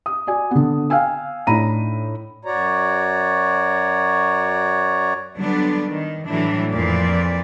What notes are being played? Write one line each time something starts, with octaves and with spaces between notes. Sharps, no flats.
D#6
F#4 D5 G#5
D3 B3
F5 G5 G#5 E6
A2 D4 D#4 A#5 B5 D#7
F#2 F#4 C#5 D5 A#5
D3 F#3 G3 B3 D4
D#3
A2 E3 F#3 G3 D4 E4
F2 A#2 E3 F3 D5